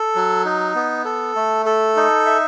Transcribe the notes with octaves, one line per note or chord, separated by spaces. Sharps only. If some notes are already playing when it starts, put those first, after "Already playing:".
Already playing: A4
F#3
D#4
B3
A4
A3
A4
D#4
E5